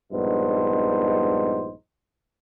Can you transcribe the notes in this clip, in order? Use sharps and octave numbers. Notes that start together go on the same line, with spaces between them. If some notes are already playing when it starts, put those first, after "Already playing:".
A#1 G2 G#3 B3 D#4 C5